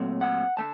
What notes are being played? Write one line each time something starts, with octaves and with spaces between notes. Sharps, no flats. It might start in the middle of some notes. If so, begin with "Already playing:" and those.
Already playing: A#2 F#3 A3 C4
F#5
D3 A3 A5